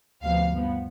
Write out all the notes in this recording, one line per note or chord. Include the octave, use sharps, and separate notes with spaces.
D2 C3 F3 B3 F5
G2 F3 B3